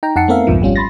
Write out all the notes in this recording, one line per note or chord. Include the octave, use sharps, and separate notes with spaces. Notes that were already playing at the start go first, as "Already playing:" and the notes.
D#4 G5 A#5
F2 D#4 F#5 A5 C7 C#7
A3 B3 C4 A#4 E5 F5
C2 F2 G#2 D3 F3
G#1 G3 C#4 F4
B5 C6 A6 A#6